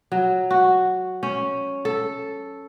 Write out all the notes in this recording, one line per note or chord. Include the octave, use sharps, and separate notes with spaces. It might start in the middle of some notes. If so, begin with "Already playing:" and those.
F#3
F#4
C#4
A4